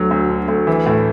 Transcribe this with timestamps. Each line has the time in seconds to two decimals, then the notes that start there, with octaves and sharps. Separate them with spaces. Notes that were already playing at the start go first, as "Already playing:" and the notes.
Already playing: D2 D3 F#3
0.11 D2
0.29 D3
0.48 D2
0.67 E3
0.86 A2